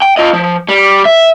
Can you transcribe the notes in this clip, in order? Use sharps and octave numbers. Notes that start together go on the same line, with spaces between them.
G5
F4 D#5
F3
G3
E5